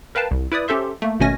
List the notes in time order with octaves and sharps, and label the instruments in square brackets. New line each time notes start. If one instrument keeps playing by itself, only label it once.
[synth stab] A#4 B4 F5 G5 A5
C2
E4 B4 D5 D#6
C#4 G4 A4 C5 E5 C6
A3 A#3
G#1 B2 A3 C#4 G#5 A#6